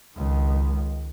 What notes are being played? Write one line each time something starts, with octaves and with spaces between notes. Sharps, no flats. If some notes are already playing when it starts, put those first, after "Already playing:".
C#2 D#3